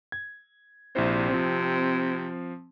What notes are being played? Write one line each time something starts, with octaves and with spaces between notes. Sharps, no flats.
G#6
A#1 C3 E4 C5
F3 C4